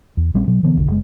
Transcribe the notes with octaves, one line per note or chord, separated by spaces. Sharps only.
E2
A#1 G3 C4 C#4
B2 F#3
B2 D3 E3 B3
E1 B1 D3
F#1 G#3